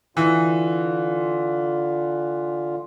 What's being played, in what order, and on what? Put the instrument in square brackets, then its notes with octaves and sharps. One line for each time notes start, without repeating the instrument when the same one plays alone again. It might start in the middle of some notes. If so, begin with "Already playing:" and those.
[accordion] D3 F4 [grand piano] E3